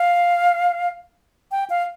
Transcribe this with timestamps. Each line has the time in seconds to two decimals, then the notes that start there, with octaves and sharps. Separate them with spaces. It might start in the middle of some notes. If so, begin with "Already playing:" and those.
Already playing: F5
1.51 G5
1.70 F5